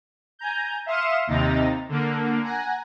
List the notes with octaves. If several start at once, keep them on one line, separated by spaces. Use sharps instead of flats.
G#5 A#5 G6
E5 F5 C6 D#6 C#7 E7
D#2 C3 D#4 A#5 A6
D3 A#3
F#5 G#5 A#5